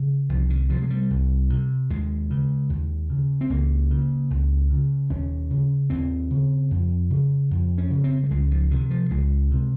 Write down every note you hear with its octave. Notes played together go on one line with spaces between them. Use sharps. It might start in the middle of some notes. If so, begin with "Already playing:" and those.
Already playing: C#3
C2 F3
D#3
C3 F3
G#3
G3
C2
C3
D#2 G#3
C#3
D#2
C#3
C4
C#2 A#3
C#3
C#2
C#3
D#2 C#4
C#3
D#2 C4
C#3
F2
C#3
F2
C#4
C#3
C4
G3
C#2 G#3
F3
C3 D#3
F3
C#2 G#3
C3